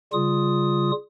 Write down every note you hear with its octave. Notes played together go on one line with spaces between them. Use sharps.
C#3 G3 F4 D#6